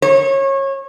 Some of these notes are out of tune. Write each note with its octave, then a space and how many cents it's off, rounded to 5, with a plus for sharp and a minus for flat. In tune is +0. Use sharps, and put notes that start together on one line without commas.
C#5 -25